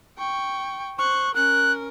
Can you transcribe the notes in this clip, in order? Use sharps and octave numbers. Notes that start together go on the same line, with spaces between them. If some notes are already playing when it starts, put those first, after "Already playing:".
G5 C#6
C5 C#6 F#6
C#4 A#4 F#6